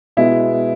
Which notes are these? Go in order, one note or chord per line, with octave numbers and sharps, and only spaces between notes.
B2 G#3 B3 E4